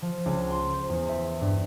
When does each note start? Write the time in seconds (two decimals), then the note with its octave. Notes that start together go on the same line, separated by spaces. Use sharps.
0.02 F3
0.26 C#2
0.50 C6
0.74 C5
0.90 E2
1.09 E5
1.41 G2